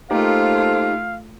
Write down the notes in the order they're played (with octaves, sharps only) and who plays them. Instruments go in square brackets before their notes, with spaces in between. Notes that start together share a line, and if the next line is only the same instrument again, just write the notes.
[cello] A3 F4 [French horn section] A#3 A4 C5 [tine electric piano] D#4 G4 [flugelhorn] F5